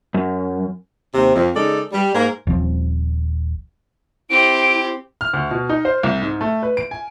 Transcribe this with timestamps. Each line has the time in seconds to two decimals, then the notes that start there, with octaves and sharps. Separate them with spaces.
0.14 F#2
1.14 D#2 C3
1.35 F2
1.56 C#3 G#3 D#4 A4 D5
1.92 G3
2.15 G#2 A#3 A#4
2.47 D#1 F3 C4
4.30 C4 E4 G4 D7
5.21 F6
5.33 D2
5.51 B2
5.69 D#4
5.85 C5
6.03 C2
6.22 G#2
6.41 A3
6.63 B4
6.77 D7
6.91 G#5